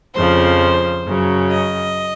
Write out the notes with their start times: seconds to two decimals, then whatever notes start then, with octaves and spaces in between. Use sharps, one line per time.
0.14 F2 C#3 F3 C5
1.05 F#2 C#3 F#3
1.51 D#5